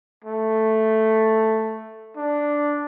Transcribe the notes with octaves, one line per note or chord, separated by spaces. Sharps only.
A3
D4